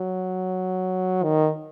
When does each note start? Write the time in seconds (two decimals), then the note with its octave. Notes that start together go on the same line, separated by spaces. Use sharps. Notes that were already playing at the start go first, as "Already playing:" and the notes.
Already playing: F#3
1.23 D#3